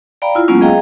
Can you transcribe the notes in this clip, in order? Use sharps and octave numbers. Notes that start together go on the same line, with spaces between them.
D5 F5 G5 A#5 B5
E4 F4
F#3 G#3 A#3 B3 C#4 F4
G#4 D#5 F5 G5 A#5